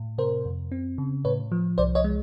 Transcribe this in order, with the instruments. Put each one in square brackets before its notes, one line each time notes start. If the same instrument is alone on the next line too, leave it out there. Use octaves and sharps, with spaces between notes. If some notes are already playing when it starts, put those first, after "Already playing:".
Already playing: [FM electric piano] A2
C3 A#4 C5
F2
C4
C#3
A2 B4 C#5
F3
C2 C5 D5
C#5 D#5
G#3